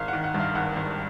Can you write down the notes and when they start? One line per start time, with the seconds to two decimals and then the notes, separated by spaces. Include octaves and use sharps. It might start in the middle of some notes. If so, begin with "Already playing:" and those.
Already playing: G#1 F5
0.08 D#3 F#5
0.24 F#5
0.34 G2
0.40 F5
0.55 G#1 F#5
0.76 G#1